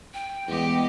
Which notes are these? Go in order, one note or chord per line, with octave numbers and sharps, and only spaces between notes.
G5
E2 G#3 B3 G4 D#5